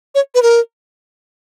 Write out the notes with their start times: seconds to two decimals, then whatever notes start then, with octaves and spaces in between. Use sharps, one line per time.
0.15 C#5
0.35 B4
0.42 A#4